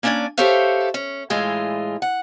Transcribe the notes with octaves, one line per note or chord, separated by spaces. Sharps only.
A#3 C#4 D4 E4 D5 G#5
G4 A4 C5 C#5 E5 F5
C#4
A2 E3 G#3 F4
F#5